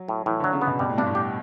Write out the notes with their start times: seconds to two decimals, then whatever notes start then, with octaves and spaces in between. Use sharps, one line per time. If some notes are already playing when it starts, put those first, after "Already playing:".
Already playing: F#3
0.08 A2
0.26 A2 E3
0.40 D3 F#3
0.53 C#3
0.61 B3
0.67 B2
0.79 B2 G3
0.89 A2
0.98 G2 D4
1.06 A2
1.15 G4